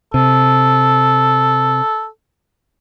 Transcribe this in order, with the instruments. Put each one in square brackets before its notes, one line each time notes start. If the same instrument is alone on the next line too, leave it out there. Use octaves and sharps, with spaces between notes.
[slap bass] C3 [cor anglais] A4